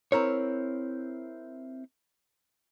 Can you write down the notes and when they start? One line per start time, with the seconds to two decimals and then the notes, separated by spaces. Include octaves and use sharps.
0.12 C4 E4 A#4 C#5